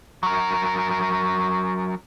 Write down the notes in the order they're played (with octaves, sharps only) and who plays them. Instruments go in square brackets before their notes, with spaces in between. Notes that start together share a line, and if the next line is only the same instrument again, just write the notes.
[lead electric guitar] F#3 A#4